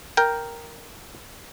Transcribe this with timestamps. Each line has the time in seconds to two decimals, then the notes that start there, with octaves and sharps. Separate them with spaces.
0.17 A#4 G5